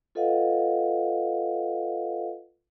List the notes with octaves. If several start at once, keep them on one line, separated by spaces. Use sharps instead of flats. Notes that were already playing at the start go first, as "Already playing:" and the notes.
F4 A4 B4 D#5 F5 F#5